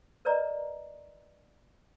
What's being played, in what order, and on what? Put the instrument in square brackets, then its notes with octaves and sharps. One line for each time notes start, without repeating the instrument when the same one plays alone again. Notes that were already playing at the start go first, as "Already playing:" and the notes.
[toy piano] A#4 B4 D5 D#5 A#5